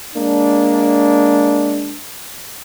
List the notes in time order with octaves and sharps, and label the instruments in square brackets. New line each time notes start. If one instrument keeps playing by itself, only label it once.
[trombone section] G#3 A#3 D4